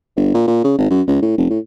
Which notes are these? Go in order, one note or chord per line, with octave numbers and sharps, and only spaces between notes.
G1
A#2
A#2
C#3
G#1
F#2
C#2
A2
F1
A2